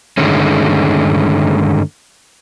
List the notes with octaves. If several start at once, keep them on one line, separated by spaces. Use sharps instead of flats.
G2 D3 D#3 G#3 A3 C#4